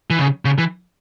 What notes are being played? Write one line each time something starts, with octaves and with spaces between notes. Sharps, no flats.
E3
C#3
C#3
E3